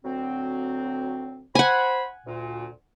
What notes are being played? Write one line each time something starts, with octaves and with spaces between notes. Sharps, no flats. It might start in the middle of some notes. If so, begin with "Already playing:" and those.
D2 F#3 C4
C5 F#5 G#5 B5
D2 A#2